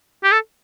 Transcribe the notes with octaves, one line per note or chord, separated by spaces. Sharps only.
G4
A4